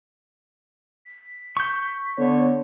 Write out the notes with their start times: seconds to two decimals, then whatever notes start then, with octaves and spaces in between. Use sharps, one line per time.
1.05 B6
1.57 C#6 G6
2.18 D3 B3 C#5